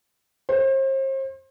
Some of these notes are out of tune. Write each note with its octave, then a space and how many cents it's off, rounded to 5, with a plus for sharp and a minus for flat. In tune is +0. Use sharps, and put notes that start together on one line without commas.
C5 +40